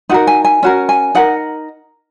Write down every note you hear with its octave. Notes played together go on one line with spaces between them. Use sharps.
D#4 F#4 A#4 F#5
G#5
G#5
C#4 F#4 A#4
G#5
D#4 A#4 F#5